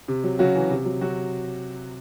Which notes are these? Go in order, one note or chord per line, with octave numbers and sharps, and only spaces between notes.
C3
F#3
C#3 F#3 F#4
E3
C3
F#3
C3 F#3 F#4